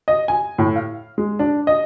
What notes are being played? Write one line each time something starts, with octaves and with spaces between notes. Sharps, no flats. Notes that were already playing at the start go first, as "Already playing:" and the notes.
D#5
G#5
A2
F5
G#3
D4
D#5